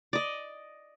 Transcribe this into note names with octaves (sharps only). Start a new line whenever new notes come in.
D5 D#5